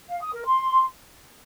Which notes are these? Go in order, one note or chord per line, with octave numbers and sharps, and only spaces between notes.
F5
D#6
A#4
C6